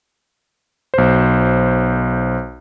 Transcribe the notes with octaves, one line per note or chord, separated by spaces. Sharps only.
B1 C5